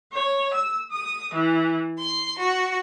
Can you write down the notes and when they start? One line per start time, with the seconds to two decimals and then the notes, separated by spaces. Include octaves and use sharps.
0.13 C#5
0.54 E6
0.90 D#6
1.33 E3
1.98 C6
2.38 F#4